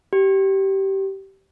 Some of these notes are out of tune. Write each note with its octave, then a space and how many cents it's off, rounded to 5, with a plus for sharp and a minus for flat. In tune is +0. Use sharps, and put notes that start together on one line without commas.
G4 -20